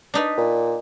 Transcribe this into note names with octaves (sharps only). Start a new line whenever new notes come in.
D4 D#4 B4
A#2